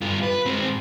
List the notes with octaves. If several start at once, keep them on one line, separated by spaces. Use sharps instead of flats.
G2 F4
B4
G#2 C4